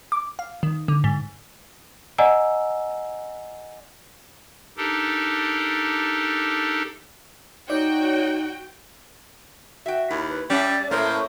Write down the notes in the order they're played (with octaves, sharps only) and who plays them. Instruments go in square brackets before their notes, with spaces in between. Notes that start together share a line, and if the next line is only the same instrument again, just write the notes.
[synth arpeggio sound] D6
F5
D#3
D3
G#2
[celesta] D5 D#5 F#5 G#5 A#5 E6
[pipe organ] D4 D#4 G4 A4 A#4
[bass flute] D#4 [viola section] F#4 G5 [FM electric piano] C#5 D5
[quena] F#4 [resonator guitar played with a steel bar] E5 G5
[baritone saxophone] D#2 [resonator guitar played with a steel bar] E4
[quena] B4
[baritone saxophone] G3 [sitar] C#4 E5 [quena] D5
[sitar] A2 [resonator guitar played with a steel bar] A3 [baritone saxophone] A#3 [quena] C5